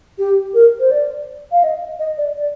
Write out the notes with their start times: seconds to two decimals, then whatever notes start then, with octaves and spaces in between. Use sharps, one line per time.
0.19 G4
0.54 A#4
0.79 C5
0.91 D5
1.52 F5
1.63 D#5
1.99 D#5
2.18 D5
2.36 D5